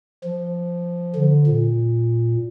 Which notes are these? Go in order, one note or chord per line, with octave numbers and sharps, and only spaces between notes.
F3
D3
A#2